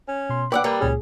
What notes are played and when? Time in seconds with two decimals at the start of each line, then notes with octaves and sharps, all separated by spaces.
0.08 C#4
0.29 B2 C6
0.52 B4 D5 F#5 G5 D6 E6
0.64 G3 A#3 B4
0.81 C#2 A#2 C#4 G#4